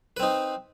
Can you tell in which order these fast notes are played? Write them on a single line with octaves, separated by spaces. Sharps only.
B4 C4 D#4